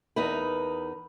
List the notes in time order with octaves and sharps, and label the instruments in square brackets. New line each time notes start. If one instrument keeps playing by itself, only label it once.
[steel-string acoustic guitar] E2 D#4 A#4 B4